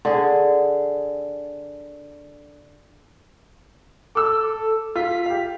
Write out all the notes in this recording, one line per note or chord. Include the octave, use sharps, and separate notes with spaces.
D3 G#4
A4 D6 E6
F4 B6
G4 F5